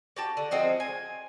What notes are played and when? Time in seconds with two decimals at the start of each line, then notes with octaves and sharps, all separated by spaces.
0.16 F#4 G4 A5
0.37 D3
0.51 F3 G#3 C4 F#4
0.80 G#5